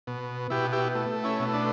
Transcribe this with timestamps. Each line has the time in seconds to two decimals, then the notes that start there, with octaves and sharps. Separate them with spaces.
0.07 B2
0.50 B2 E4 G4
0.73 E4 G4
0.95 A3
1.24 C#4 E4
1.40 B2
1.54 D4